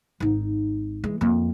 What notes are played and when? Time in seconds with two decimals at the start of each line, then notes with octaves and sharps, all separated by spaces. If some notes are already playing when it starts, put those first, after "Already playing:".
0.20 G#1 D#4
1.04 E3 G#3
1.21 F2 A#3